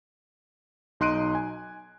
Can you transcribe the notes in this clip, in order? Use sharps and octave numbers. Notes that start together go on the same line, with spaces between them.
B1 D#4 C6 F#6 D7 D#7
G#5